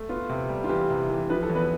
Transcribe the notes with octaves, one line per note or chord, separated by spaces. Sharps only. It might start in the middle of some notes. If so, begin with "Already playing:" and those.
Already playing: A3
B3 F4
C3
G3
F4
E3 G4
C3
E3
F3 B4
A4
E2
B3 B4